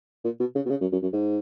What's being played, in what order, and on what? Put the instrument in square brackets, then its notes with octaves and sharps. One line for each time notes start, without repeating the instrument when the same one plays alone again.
[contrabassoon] A#2
B2
C#3
B2
C#3
F#2
F#2
F#2
G#2